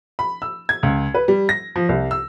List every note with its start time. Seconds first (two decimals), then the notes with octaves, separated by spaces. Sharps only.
0.19 B5
0.42 E6
0.69 G#6
0.83 C#2
1.15 B4
1.28 G3
1.49 A#6
1.76 F3
1.89 C2
2.11 E6